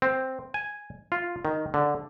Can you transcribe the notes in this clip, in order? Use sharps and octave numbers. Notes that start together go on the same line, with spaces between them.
C4
G#5
F4
D#3
D3